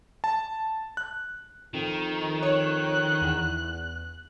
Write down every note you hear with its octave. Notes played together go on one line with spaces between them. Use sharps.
A5
F#6
F2 D#3
C#5 F#6
E2